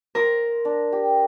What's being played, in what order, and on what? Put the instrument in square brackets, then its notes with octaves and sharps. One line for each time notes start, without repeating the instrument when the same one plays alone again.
[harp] A#4 [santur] C5 A#5
[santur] D4
G4